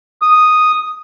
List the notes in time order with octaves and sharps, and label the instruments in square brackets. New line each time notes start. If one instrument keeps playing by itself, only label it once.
[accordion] D#6